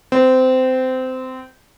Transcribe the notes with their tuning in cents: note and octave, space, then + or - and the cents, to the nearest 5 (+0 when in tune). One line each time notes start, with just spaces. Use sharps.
C4 -20